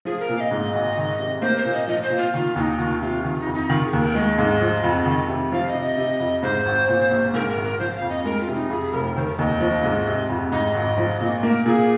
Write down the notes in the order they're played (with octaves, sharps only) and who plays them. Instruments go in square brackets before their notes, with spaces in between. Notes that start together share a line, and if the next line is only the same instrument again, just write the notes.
[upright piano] F3 [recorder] G#4
[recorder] A#4
[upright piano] A#2
[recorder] F5
D#5
[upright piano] G#2
G#1
D#3
C3
[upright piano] A#3 [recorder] C5
[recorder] C5
[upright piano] A#2
[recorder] D#5
[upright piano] F3 [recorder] D#5
[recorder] C5
[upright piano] A#2
[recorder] F4
[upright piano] D#3 [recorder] F4
[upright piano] D#2 [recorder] F4
[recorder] D#4
[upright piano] D#3 [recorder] F4
[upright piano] C3 [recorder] F4
[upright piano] D#3 [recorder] F4
[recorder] D#4
[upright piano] F2
[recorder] D#4
[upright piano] D#3 [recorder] F4
[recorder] G#4
[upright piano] D#2
[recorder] A#4
[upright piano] G#3 [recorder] D#5
[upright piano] G#2
F3
F2
D#3
C3
[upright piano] F3 [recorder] F5
[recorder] D#5
[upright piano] C3
[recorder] D#5
[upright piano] C3
F2
[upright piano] G#2 [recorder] C5
[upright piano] G#1
A#2
A#1
[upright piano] G#2 [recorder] A#4
[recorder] A#4
[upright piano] G#1
[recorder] A#4
[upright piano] F3 [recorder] C5
[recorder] F5
[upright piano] F2
[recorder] D#5
[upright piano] G#3 [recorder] A#4
[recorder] F4
[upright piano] C3
[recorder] D#4
[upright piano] F2 [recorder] G#4
[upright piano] F1 [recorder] A#4
[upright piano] D#3 [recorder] A#4 C5
[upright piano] D#2 [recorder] D#5
[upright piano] F3
G#2
C3
F2
[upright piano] G#2 [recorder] D#5
[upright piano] G#1
F3
A#2
[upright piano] A#3 [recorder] A#4
[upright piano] A#2 [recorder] G#4